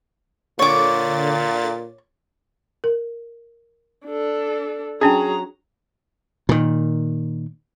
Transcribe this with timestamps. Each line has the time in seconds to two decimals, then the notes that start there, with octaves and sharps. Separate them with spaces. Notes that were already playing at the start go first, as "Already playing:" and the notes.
0.59 A#2 D3 C#5 D6 A6
2.84 A#4
4.06 D4 A4
5.01 F#3 C#4 D4 G#4 G5 A#5
6.49 A#2 D#3